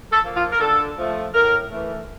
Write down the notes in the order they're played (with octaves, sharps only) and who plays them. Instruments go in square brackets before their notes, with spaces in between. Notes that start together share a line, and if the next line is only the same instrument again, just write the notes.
[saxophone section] A4
F3 A#3
F4
A#4
D3 A4
F3 A3
A2 A#4
E3 A3